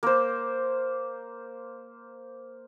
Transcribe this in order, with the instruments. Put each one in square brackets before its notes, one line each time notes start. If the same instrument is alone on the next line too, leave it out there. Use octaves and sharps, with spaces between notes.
[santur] A#3 C5